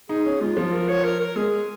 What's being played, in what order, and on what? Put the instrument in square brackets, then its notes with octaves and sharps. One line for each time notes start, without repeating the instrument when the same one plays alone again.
[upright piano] D#4 [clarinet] G#4
[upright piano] C#4
[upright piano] G#3 [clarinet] F4
[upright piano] F3
[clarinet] A#4
C#5
A#4
A#4
[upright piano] G#3 [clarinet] G#4